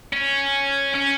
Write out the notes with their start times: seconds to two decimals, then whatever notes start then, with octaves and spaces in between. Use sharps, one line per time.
0.13 C#4
0.95 C#4